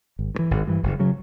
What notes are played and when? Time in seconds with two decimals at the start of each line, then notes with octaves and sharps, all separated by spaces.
0.19 G#1
0.35 G2
0.39 E3
0.51 G#1
0.67 G2 E3
0.83 F#1
1.00 C#3 F#3